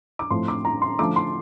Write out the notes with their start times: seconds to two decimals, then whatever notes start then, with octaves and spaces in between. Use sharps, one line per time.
0.19 D6
0.30 A2 F3 A3 C4 C6
0.48 D6
0.65 A#5
0.82 C6
0.99 D3 F3 A3 D6
1.16 C6